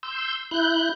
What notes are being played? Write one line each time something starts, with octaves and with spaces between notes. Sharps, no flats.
C6 E6 G6
E4 F#6 G6